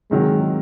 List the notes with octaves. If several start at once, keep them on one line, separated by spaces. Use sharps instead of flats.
C3 D#3 F#3 G#3